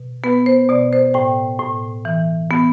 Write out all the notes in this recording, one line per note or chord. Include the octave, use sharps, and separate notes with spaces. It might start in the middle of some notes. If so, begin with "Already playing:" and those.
Already playing: B2
B3 B4
C5
B2 D5
C5
A2 G5
A2
E3
B3